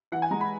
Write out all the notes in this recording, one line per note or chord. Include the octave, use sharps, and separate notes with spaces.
E3 F#5
G#5
G#3 A#5
B5